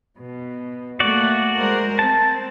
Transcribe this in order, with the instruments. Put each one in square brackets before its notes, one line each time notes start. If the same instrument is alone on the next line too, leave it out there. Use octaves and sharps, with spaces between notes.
[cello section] B2
[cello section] A3 A#3 [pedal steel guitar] F#4 D5
[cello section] G#3 A#4 C5
[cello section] C4 [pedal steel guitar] A5